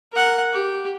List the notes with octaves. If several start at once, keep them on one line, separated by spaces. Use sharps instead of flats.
A#4 F#5
G4